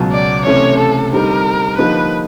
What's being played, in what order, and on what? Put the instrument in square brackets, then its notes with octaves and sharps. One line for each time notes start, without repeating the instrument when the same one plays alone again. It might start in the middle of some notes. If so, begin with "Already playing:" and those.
Already playing: [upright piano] C#2 B2 F#3
[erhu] D5
[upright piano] C3 E3 A3 C#4 [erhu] C#5
[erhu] A4
[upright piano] D3 G3 C4 D#4 G4 [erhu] A#4
[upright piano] D3 F3 A#3 D#4 G4 [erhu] B4